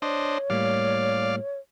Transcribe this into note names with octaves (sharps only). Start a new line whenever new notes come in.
D4 C5 C#5 D#5
A2 G3 A#3 D5 F5